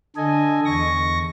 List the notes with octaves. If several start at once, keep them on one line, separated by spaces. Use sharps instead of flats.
D3 A4 D#5 G#5
E2 C#6 A#6